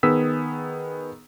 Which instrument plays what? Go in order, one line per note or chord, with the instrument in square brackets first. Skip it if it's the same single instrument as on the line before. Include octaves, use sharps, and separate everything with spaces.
[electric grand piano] D#3 B3 G#4 D#6 E6 B6